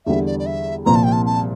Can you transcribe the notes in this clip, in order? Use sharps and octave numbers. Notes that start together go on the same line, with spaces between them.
E2 D3 G3 E5
D5
D5
E5
C2 A#2 F3 A#3 A#5
A5
G5
A5
A5